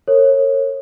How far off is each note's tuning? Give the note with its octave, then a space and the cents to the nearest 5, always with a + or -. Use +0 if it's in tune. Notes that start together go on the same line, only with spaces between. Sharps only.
A#4 -35 C#5 -25